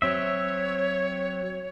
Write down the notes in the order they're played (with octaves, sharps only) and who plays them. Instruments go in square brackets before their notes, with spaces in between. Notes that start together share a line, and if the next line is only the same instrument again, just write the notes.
[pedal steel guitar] F#3 C4 E5 [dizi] C#5